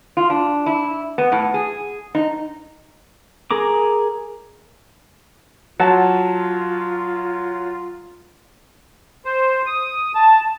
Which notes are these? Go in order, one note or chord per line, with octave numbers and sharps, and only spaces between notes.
F4
D4
E4
B3
A2
G#4
D#4
G#4 A#4 A#5 D6
F#3 F4 F#5 A5
C5
D#6
A5